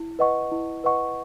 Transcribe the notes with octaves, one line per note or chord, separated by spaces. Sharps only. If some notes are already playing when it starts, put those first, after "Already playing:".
Already playing: E4
B4 D#5 F#5 C#6
E4
B4 D#5 F#5 C#6